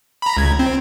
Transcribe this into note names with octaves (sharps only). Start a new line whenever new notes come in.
A#5 B5
C#2 G#6
C4